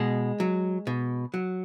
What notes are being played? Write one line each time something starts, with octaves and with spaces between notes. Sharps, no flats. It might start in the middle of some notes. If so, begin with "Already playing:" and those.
Already playing: B2 G#3
F#3
B2
F#3